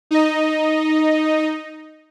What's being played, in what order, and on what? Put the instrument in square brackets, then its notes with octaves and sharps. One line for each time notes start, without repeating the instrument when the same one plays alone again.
[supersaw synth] D#4 D#5